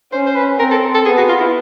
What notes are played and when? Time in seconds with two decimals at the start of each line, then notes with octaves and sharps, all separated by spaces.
0.12 C#4 C5
0.26 C5
0.35 B4
0.59 C4 A#4
0.71 A4
0.94 A4
1.06 B3 G#4
1.18 F#4
1.29 F4
1.40 E4